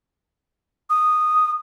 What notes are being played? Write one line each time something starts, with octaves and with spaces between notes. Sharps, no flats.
D#6